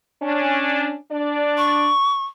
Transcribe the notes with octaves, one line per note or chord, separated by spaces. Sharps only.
C#4 D4
D4 D5
C#6